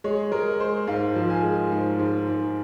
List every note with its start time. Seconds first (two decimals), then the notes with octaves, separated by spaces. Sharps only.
0.04 G#3 C#5
0.32 G#3 A#4
0.60 G#3 C5
0.87 G#2 F5
1.15 F3
1.30 G#5
1.43 G#3
1.72 G#2
1.99 G#2
2.29 G#2